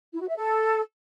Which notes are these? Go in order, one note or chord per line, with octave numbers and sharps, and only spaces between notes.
E4
F#4
E5
A4